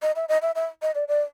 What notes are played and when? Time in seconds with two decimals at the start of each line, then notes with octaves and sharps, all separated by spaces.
0.02 D#5
0.16 E5
0.29 D#5
0.42 E5
0.55 E5
0.82 D#5
0.95 D5
1.08 D5